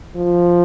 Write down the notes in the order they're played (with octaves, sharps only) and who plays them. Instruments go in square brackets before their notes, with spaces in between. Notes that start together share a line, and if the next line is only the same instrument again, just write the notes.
[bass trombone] F3